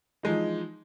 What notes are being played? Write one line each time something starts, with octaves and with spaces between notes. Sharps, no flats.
E3 F3 G#3 D#4